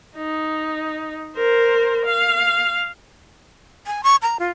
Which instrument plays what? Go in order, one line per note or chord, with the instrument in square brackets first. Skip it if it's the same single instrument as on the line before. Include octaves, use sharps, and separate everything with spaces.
[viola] D#4
A#4 C5
F5
[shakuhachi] G#5
C#6
A#5
F4